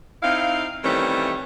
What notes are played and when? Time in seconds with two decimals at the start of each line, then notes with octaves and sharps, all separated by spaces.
0.23 C4 D#4 E4 F5
0.84 D#3 E3 G3 A3 C4 C#4